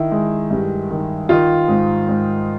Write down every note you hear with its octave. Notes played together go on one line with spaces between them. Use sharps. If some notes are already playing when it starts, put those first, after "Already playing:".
Already playing: D#3 E4
G#3
G2
D#3
D#3 F4
G#2
G#2